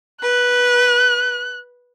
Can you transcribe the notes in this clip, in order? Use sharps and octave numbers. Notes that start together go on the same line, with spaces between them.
B4 F#6